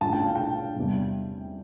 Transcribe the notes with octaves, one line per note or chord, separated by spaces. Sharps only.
A1 G2 F3 A5
G5
F5
G5
E2 C3 G3